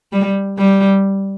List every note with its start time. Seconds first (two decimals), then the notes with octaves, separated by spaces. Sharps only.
0.12 G3
0.58 G3